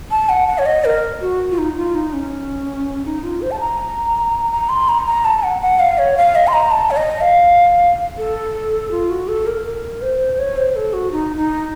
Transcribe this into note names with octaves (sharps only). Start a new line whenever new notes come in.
A5
F#5
F#5
C#5
D#5
A#4
F#4
F4
D#4
F4
D#4
C#4
D#4
F4
C5
A5
A#5
A#5
C6
A#5
A#5
A5
F#5
F#5
F5
C#5
F5
D#5
C6
A#5
A5
C#5
D#5
F5
A4
F4
F#4
A4
A#4
A#4
C5
C#5
C5
A4
F#4
D#4
D#4